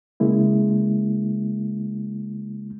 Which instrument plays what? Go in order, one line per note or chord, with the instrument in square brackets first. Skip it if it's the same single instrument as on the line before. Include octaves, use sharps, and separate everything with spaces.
[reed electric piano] C#3 G#3 A#3 E4